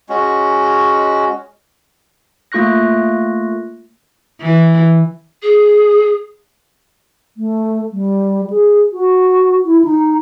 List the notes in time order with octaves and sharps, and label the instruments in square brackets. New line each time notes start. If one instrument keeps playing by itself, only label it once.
[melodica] G#3 C#4 F#4
[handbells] A3 A#3 F4 C#6 F#6 A#6
[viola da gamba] E3
[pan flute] G#4
[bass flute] A3
G3
G#4
F#4
E4
D#4